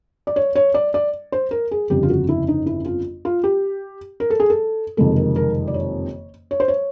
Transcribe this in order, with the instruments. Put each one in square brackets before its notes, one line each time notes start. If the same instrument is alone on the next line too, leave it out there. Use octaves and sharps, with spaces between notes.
[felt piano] D5
C#5
C#5
D5
D5
C5
A#4
G#4
G1 F2 C#3 G4
F4
F#4
E4
D#4
E4
F4
F4
G4
A#4
A4
G#4
A4
F#1 F2 C3 D#3 G#3 A4
A#4
A#4
D5
C#5
C#5
C5
C#5